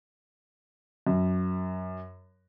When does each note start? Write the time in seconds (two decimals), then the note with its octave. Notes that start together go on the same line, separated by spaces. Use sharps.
1.07 F#2